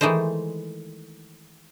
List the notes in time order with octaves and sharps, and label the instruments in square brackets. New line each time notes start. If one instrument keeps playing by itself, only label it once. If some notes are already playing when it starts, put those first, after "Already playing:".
[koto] D#3 E3 G#3 A3 D#4 C5